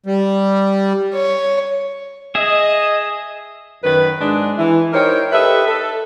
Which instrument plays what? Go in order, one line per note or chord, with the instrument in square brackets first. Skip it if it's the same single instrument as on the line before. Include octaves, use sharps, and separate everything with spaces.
[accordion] G3
[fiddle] C#5
[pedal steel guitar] G#4 E5 [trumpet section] D#5
[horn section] F#2 D#3 B4
G#2 G#3 D4
E3
D#4 E4 A#4 C5 C#5 G5
G4 A4 B4 D#5 E5
A4